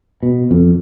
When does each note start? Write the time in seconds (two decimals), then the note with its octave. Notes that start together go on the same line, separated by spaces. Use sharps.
0.23 B2
0.51 F2